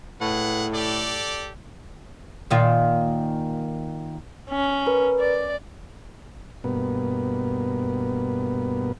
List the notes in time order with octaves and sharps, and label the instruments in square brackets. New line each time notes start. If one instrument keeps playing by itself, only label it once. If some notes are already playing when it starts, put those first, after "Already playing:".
[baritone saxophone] A2 [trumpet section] G#4 B4 F#5
[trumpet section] G4 A4 D5
[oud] A#2 D#3 F4
[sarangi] C#4
[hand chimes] A#4 B4
[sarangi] D5
[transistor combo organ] G2 B2 A#3 B3